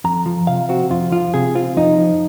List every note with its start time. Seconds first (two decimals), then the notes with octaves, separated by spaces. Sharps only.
0.04 F2 A#5
0.26 F3
0.47 C3 F5
0.69 C4 F#4
0.90 F2 F4
1.12 F3 F4
1.34 C3 G#4
1.55 C4 F4
1.77 F2 D#4
1.98 F3